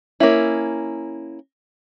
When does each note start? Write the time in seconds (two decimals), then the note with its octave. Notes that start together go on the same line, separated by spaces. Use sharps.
0.20 A#3 C#4 E4